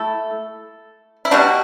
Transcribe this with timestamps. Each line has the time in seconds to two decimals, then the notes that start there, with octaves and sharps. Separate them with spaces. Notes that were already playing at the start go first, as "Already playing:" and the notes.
Already playing: A3 E4 A4
1.25 E4
1.31 B2 G3 D4 F#4